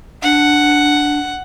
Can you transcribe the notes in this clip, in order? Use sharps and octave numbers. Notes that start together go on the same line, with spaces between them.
D4 F#5